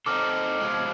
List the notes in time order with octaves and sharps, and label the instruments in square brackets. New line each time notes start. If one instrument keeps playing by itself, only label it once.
[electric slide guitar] C4 D#4 A4 [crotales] D6 F6
[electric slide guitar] B2 F3 G#3